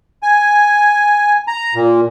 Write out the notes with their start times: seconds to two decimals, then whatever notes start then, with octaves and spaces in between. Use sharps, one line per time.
0.23 G#5
1.48 A#5
1.75 A#2